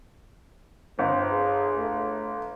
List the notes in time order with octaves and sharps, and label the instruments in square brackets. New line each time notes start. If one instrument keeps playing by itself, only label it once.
[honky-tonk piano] G1 [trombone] C4
[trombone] G#4
A3